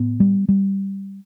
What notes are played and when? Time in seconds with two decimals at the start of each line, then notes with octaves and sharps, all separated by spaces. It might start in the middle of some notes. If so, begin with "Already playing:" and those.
Already playing: A2 B3
0.20 G3
0.49 G3